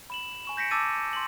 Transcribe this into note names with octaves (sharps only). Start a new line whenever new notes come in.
B5 E7 F#7
G#5 C#6 E7
G6 A#6 B6 C#7 D7
A5 D6 E6 A6 D#7
C6 F#7